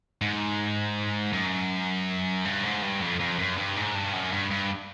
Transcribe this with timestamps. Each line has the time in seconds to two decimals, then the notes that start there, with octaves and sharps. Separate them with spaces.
0.22 G#2
1.33 F#2
2.46 G2
2.64 G#2
2.83 G2
3.01 F2
3.20 F2
3.39 F#2
3.57 G2
3.76 G#2
3.95 G2
4.13 F#2
4.32 G2
4.51 G2